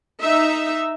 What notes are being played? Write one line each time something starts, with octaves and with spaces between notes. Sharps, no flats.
D#4 E5